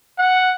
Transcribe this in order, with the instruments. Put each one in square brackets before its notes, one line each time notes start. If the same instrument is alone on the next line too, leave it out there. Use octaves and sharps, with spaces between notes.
[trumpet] F#5